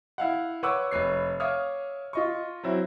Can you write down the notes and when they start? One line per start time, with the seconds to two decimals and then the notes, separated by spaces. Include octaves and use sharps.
0.18 E4 F5 F#5
0.63 B4 C#5 F#5 C#6 D6 E6
0.91 F1 B4 C#5 C7
1.40 C#5 E5 F5 D6 D#6 F6
2.13 F4 D#5 C#6
2.64 F#3 C4 E4